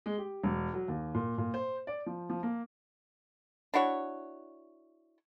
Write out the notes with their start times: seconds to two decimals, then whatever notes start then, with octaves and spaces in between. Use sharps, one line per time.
0.06 G#3
0.18 G4
0.43 E1
0.74 F#3
0.88 D#2
1.15 A#2
1.38 A#2
1.54 C5
1.87 D5
2.06 F3
2.30 F3
2.43 A#3
3.74 D4 E4 F#4 C#5